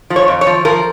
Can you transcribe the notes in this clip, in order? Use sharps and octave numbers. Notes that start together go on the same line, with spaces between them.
F3
C#5
F2
C#5
F3
F3 A#4